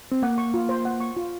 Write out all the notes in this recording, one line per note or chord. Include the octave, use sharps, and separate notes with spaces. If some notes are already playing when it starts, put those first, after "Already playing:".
C4
A#3 F#5
C#6
F4
C5
F#5
C#6
F4